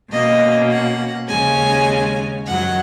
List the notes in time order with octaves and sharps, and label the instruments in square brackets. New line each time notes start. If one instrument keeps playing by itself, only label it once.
[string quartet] B2 A#3 C#4 D#5
F#5
D#2 C#3 G#3 C#4 G#5
F#2 D#3 F#3 F#5